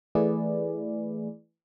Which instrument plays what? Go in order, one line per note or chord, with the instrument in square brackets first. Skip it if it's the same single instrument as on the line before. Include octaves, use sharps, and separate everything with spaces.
[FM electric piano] E3 A3 E4 G#4 B4 D5